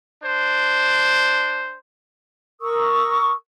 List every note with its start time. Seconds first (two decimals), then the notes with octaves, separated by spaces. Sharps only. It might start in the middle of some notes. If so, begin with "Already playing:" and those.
0.23 D4 C5
2.61 A#4 C#6 D#6 E6